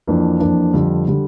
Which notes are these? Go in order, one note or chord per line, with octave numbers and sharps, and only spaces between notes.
F2 E3 A#3 D4
F2 E3 A#3 D4
F2 D3 G3
D3 G3